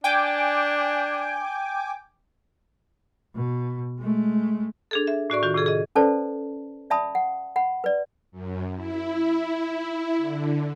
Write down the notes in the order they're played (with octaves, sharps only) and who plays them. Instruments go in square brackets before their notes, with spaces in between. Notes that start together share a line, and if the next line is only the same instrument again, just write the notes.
[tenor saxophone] D4 [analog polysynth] G5 G#5 D6
[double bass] B2
G#3 A3
[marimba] D4 G#4 A4
E5
A2 F#4 D5 C#6
D#3 F4 F#4
A2 C3 G#4 A4
G#4 D#5
[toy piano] C#4 A4 B4 C5 D5 A5
D5 E5 A5 B5 D#6
F#5
F#5 B5
B4 D5
[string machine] F#2
E4
D3